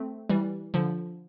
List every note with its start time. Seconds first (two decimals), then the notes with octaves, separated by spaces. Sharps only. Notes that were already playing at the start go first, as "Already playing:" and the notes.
Already playing: A3 C4
0.29 E3 G3
0.74 D3 F3